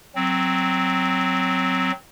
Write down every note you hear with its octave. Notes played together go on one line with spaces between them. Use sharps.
F#3 C4